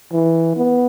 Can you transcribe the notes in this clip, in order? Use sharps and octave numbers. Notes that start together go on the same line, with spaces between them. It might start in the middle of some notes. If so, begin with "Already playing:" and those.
E3
B3